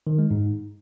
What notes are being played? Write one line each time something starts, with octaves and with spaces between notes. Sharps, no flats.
D#3
G#3
G#2